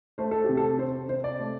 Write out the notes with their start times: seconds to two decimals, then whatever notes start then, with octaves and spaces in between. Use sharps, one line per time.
0.18 A3 C5
0.31 A4
0.44 C3 G4
0.57 A4
0.79 C4 C5
1.09 C3 C5
1.24 D5
1.39 A3